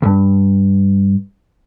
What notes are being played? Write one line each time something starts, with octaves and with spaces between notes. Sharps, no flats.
C#2 G2